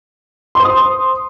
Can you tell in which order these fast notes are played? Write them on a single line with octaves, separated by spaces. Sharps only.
C6 C5 D#6